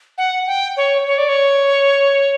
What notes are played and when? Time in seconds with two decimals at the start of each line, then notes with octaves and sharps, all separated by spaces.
0.18 F#5
0.47 G5
0.77 C#5
1.07 C#5
1.18 D5
1.29 C#5